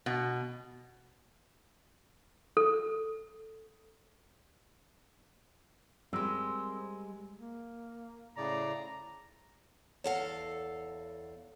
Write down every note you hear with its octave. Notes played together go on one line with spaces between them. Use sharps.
B2
A4
G3 G#3 C4 A#4 C5
A#3
A2 C#3 D5 A#5
E2 A4 C#5 F5 F#5